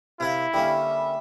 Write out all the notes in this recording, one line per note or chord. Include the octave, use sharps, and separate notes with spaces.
C3 E4 A#4 F5
D3 G3 A#3 C#4 E5